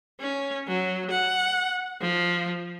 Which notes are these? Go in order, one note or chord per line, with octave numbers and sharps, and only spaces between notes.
C#4
F#3
F#5
F3